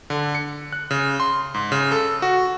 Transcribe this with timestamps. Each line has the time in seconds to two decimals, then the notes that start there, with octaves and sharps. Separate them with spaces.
0.10 D3
0.35 C#7
0.73 F#6
0.91 C#3
1.20 C6
1.54 G#2
1.72 C#3
1.92 A4
2.22 F#4